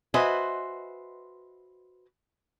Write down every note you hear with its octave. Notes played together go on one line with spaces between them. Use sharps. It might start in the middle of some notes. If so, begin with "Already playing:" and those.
F#4 B4 C5 D#5 E5 G#5